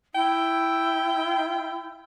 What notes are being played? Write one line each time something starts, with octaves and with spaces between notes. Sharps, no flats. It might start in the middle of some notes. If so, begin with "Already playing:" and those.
E4 G5